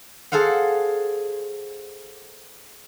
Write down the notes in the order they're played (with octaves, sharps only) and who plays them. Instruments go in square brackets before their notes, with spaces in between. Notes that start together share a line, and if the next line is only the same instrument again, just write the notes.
[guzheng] G#4 A4 C5 F5 F#5